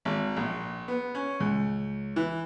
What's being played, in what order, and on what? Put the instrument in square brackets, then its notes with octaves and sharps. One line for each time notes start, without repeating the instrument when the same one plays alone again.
[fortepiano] G#1
A#1
B3
C#4
C#2
E3